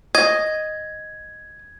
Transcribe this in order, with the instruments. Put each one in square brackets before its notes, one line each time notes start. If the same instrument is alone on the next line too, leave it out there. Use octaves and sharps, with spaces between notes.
[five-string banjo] D#5 [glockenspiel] G#6